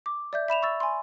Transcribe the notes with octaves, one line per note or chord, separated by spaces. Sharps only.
D6
D5 E5 G6
E5 B5 E7 F7
C#6 E6 A6
G#5 B5 C6